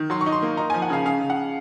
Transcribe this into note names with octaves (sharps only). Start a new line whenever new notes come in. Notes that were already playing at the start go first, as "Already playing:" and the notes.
Already playing: D#3
F#3 C6
C#6
D#4
C6
A#3
D#4 A#5
G#5
F3
F#5
C#3 F5
C#3 F5
C#3
F#5